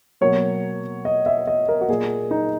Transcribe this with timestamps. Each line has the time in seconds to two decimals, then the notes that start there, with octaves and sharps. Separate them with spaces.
0.21 B2 F#3 A#3 C#5
1.05 D#5
1.26 E5
1.47 D#5
1.68 A#4
1.81 F#4
1.88 A#2 A#3 G#4
2.31 D#4